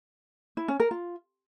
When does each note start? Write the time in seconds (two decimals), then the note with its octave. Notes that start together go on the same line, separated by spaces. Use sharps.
0.57 E4
0.68 C#4
0.80 A#4
0.91 F4